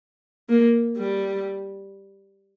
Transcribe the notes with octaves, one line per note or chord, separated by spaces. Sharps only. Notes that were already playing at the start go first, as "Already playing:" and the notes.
A#3
G3